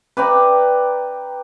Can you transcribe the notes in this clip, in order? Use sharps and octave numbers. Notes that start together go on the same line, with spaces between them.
B4 D5 G5 A#5